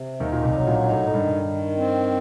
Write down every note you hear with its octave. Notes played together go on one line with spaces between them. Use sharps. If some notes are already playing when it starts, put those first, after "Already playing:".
Already playing: C3
D#2 D#3 D#4
A#2
C2 C3
F#3
A#1 A#2
D#4
A2
A2
G2 D#3
D#3
C4